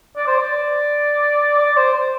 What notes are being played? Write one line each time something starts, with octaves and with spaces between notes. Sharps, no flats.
D5
C5
D5
D5
C5
C5